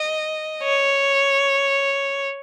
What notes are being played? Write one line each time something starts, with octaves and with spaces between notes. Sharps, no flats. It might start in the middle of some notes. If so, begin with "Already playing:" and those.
Already playing: D#5
C#5